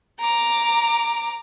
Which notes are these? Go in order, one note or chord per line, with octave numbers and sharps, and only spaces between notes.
A#5 D6